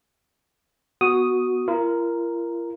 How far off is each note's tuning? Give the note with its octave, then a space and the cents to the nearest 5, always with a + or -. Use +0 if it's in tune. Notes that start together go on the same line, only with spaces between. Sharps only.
B3 +0 F#4 +0 D#6 +0
F4 -45 A#4 +0